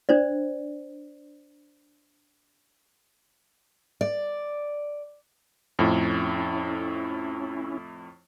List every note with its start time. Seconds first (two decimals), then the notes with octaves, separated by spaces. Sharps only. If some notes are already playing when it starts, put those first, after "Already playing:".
0.09 D4 C5 D5
4.01 D5
5.79 F2 A2 C#4 E4